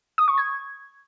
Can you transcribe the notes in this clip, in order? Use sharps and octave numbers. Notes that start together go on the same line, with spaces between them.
D#6
C#6
G#6